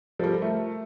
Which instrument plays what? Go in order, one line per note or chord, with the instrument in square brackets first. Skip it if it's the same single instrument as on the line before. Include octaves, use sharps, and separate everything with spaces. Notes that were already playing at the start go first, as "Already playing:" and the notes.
[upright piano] F3 G3 [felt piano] A4 A#4
[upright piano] A3